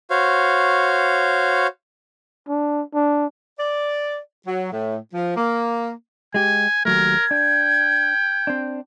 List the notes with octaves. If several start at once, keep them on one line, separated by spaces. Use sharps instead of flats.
F#4 C5 C#5 F5
D4
D4
D5
F#3
A2
F3
A#3
G#3 G4 G#5
D#2 F#3 A3 A#4 G#6
D4 G5
C4 D4